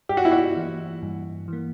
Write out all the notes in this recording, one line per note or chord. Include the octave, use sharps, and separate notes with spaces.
G2 G4
F#4
E4
F#4
E3 A#3
G2
E3 A#3